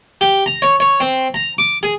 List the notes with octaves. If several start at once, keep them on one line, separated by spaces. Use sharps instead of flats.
G4
A#5
C#5
C#5
C4
A#5
D6
G#4